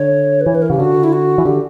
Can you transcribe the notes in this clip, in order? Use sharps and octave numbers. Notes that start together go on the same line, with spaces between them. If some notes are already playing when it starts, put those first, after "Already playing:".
Already playing: D3 C#5
B4
E3 C#5
B4
A#4
C#3 G4
D3 F#4
E4
F#4
E3
D3 G4